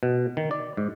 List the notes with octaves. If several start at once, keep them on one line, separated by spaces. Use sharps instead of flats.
B2
D#3
D5
G#2